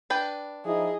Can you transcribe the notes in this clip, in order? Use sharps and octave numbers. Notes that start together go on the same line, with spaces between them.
D4 B4 G5
F3 D#4 E4 G#4 D#5